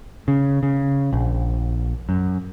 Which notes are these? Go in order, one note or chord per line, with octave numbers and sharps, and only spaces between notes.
C#3
C#3
A#1
F#2